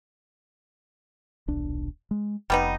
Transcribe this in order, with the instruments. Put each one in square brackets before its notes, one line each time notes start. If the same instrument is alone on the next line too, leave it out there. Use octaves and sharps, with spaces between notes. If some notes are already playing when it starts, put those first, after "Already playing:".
[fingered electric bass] D#1 B1 D4
G#3
[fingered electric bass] F1 [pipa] G3 B3 D#4